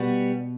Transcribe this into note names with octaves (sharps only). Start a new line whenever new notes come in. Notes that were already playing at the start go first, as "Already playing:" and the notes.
Already playing: B2 G3 B3 F#4